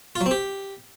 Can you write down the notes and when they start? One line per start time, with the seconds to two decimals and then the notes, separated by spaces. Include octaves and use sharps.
0.16 F4
0.21 F#3
0.26 C4
0.31 G4